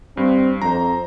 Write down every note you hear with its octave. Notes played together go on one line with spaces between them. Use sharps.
G2 C4
F2 C5 A#5